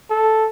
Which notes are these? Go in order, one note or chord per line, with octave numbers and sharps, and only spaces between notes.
A4